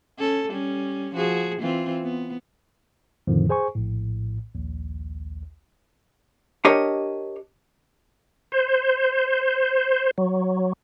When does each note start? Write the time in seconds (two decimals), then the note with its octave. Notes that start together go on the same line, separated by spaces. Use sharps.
0.19 C#4 A4
0.51 G3 C#4
1.15 F3 F#4 G#4
1.60 E3 C4 F4
2.03 B3
3.27 F2 A2 D3 D#3 F3
3.49 G#4 C5 G#5 C#6
3.75 A#1 A2
4.55 A#1 D#2
6.65 D4 G4 A#4 C#5 D#5
8.52 C5
10.18 F#3